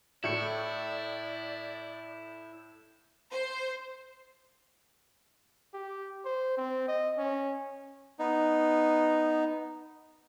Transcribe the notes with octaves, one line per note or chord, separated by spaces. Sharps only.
A2 E4 D5 C#7
C5
G4
C5
C4
D#5
C#4
B3 D#4